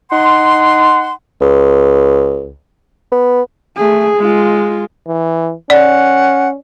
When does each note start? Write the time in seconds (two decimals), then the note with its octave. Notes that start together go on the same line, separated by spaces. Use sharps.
0.11 D#4 F#5 C6
1.41 C#2
3.12 B3
3.76 A3 G#4
4.17 G#3 F4
5.06 E3
5.70 C#4 D5 F#5